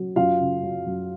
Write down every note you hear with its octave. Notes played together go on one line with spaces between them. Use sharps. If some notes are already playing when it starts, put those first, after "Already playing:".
Already playing: F#3
F#2 F4 F5
C#3
F#3
F#2